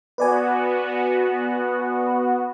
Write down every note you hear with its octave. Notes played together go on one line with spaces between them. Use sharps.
B3 F#4 B4 D5 G#5